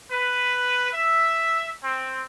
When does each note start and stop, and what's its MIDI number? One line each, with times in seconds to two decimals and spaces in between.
0.12 0.89 71
0.93 1.69 76
1.83 2.23 60